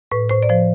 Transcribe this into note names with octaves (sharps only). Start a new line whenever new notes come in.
A2 B4
A2 C5
D5
F3 C5